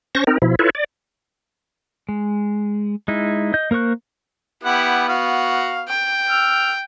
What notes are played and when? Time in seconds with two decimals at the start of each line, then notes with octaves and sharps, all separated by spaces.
0.15 C#4 C5 C#6 A#6
0.27 C4 D#4 A#4
0.42 B2 F3 E4
0.59 E4 F4 A4 B4 C#5
0.75 D5
2.09 G#3
3.08 G#3 D#4 E4
3.54 D#5 G6
3.71 A#3 A#4 C5 C#6 F#6
4.63 B3 E4 G4 F#5
5.09 F#4 F5
5.88 G5
6.30 E6 F6